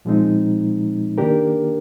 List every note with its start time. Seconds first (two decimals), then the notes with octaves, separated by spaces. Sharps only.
0.05 A#2 F3 G#3 C4 D#4
1.18 D#3 A#3 D4 G4 A#4